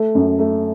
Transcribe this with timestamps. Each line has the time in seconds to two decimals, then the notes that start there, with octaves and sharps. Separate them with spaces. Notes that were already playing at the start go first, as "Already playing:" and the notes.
Already playing: A3
0.15 F#2
0.39 A3